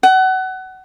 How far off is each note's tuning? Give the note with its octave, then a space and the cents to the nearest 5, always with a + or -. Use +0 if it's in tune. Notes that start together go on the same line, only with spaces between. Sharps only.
F#5 +25